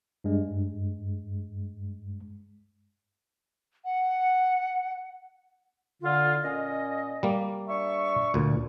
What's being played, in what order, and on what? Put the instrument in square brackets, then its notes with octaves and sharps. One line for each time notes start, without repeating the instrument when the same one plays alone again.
[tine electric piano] G2 G#3
[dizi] F#5
[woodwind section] D3 F4
A#2 C#4 D#5
[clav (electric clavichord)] G3 A#3
[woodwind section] D4 E5 C#6
[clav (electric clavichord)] D2 A#2